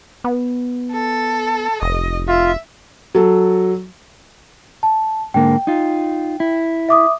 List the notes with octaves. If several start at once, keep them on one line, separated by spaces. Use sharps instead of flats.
B3
A4
F1 D#5
F4 E5
F#3 A4
A5
G#2 D3 A#3 G5
D#4 F4
E4
E5 D6 D#6